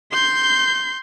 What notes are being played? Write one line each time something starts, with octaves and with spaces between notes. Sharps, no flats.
C6 G6